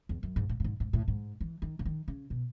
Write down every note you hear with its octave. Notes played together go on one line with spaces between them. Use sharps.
E2
F#2
G#2
A2
A2
G#2
G#2
A2
G#2
E3
D#3
C#3
D#3
C#3
B2